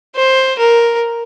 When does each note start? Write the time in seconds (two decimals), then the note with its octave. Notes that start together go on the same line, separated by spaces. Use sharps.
0.16 C5
0.59 A#4